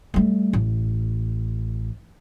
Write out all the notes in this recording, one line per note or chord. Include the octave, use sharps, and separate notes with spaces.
G3 A3
A1